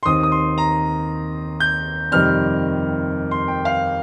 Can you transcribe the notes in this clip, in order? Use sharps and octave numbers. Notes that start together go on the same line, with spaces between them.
C6
D#2 D#3 C4 D#6
D#6
C6
A#5
G6
F2 C3 D#3 G3 C4 F6
C6
G5
F5